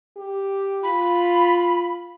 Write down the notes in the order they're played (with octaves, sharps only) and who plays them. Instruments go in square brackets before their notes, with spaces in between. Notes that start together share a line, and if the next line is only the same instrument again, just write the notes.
[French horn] G4
[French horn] F4 [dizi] B5